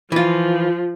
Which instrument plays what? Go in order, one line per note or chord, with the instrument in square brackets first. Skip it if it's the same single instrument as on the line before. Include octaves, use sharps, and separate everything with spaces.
[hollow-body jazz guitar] E3 F4 [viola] F3